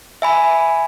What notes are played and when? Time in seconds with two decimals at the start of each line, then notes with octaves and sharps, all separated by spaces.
0.22 E5 G#5 B5